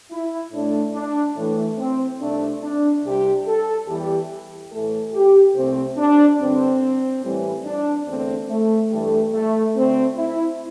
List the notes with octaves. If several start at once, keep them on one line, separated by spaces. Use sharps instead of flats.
E4
A2 A3 D4
D4
A2 E3 A3
C4
C2 C3 A3 D4
D4
C2 C3 G3 G4
A4
E2 E3 G3 G4
A2 E3 A3 A4
G4
C2 C3 A3 C4
D4
G2 D3 G3 C4
A2 E3 G3
D4
E2 D3 A3 C4
A3
G2 E3 G3 A3
A3
D2 D3 A3 C4
E4